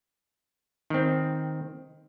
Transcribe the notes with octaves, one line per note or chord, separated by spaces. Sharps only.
D#3 C4